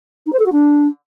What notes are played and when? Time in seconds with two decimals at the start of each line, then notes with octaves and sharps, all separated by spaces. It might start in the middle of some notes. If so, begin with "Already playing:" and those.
0.26 D#4
0.33 C5
0.39 A4
0.46 F#4
0.52 D4